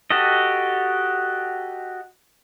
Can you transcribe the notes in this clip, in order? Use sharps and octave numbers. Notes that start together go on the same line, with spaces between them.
F#4 G4 A4 D#5